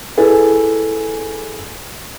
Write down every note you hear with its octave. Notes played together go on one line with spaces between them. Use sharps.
E4 G#4 A4 B4 G#5